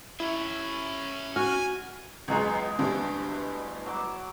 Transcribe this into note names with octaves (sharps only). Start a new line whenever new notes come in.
C#4 E4 E5
F#4 G#5 F6
C#2 F#2 B2 E3 G#3 A#5
D2 G2 D3
F#3 D6